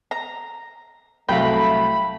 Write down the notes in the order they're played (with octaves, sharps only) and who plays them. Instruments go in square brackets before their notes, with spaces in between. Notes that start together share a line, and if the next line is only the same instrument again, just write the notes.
[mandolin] A#5
[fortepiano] C2 F#3 F5 [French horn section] A3 [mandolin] G5 [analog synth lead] B5